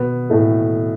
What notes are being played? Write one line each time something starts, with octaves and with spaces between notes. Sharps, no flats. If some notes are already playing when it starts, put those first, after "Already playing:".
Already playing: B2 B3
A2 A3